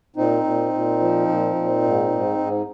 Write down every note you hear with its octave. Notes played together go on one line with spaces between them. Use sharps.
A#2 C4 D#4
A#2
A#2
F3
A#2
A#2
G#2
G#2
G#2